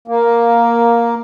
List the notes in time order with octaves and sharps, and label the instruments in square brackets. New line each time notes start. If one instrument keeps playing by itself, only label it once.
[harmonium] A#3